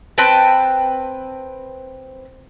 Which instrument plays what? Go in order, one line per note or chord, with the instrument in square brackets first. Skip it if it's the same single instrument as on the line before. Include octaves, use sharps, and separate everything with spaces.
[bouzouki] C4 B4 G5 A5